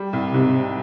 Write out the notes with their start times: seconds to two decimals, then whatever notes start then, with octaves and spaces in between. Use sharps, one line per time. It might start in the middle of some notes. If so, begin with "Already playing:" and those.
Already playing: G3
0.13 C2
0.34 G#2 C3
0.54 G3